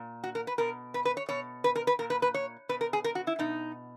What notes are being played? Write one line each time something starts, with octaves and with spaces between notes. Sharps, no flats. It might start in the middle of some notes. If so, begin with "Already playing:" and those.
Already playing: A#2
F#4
A#4
B4
B2 A#4
B4
B4
C#5
B2 C#5
B4
A#4
B4
A#2 A#4
B4
B4
C#5
B2 B4
A#4
G#4
A#4
F#4
E4
B2 D#4